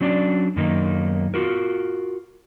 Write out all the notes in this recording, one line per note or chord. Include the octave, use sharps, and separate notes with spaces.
F#3 C#4 D4 D5
F#2 D#3 A#3 D#4
F4 F#4 A#4